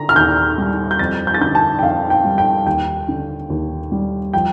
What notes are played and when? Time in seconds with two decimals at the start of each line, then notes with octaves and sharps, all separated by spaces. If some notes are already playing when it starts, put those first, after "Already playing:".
Already playing: D3 A#5
0.09 F6
0.16 D#2 G6
0.58 G3
0.91 G6
0.99 F2 A6
1.27 G6
1.34 A6
1.41 D3 G6
1.55 A5
1.79 G5
1.82 F2 F5
2.10 G5
2.25 G3
2.38 G5
2.66 D#2 G5
3.08 D3
3.50 D#2
3.92 G3
4.34 F3 G5